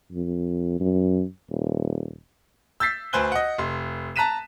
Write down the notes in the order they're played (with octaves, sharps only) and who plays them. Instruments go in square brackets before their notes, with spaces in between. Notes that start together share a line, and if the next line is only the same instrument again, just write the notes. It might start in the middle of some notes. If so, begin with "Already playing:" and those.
[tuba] F2
F#2
D#1
[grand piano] E6 G6 A6 B6 C7
D2 B4 C5 G#5 F#6 G7
D#5 F#5
F1 C6
A5 A#5 F#6 B6 D#7 E7